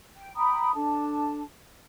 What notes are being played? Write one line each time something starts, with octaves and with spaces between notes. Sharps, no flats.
G5
G5 A#5 B5 D#6
D4 A4 A5